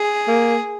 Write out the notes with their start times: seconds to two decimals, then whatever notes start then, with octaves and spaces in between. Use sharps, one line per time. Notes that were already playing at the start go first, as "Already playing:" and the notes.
Already playing: G#4
0.28 A#3